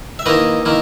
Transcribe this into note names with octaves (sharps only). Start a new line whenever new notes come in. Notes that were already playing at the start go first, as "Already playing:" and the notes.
E5
D#3 A#3 E4 B4 D#5
D#3 A#3 E4